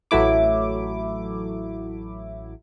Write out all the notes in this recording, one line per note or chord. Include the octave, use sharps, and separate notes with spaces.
A1 F#3 A3 E4 D6